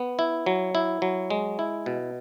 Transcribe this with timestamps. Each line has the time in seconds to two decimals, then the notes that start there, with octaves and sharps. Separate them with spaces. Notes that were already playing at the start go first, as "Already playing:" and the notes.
Already playing: B3
0.19 E4
0.46 F#3
0.75 E4
1.02 F#3
1.30 G#3
1.59 E4
1.86 B2